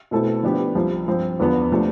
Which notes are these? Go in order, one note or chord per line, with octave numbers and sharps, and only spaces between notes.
B2 A3 C4 E4 A4
D3 F3 B3 D4 G4
C2 C3 F3
G2 F3 C4
E2 D3 F3 B3
C3 F3 A3 D4